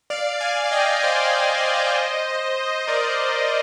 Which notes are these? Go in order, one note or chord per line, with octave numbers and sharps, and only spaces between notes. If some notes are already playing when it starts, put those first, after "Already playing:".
D5 F5
F5 G#5
F5
D#5 G5
F5
C5 D#5
A#4 D5